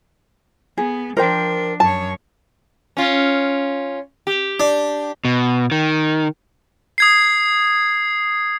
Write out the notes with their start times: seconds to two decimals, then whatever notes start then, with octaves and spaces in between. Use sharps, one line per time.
0.77 B3 G#4
1.17 F3 D4 A#4 C5 G5
1.80 F#2 C#5 A5
2.97 C#4 F4
4.27 G4
4.60 D4
5.25 B2
5.72 D#3
6.98 D#6 G#6 C7